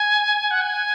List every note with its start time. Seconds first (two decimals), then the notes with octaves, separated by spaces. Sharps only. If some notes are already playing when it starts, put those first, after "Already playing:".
Already playing: G#5
0.51 F#5
0.62 G#5